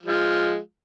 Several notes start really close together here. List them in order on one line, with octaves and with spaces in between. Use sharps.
F3 G#3 F4